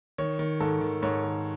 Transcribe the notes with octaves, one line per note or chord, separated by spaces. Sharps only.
D#3 C#5
D#3
G#2 A4
D#3
G#2 C#5
D#3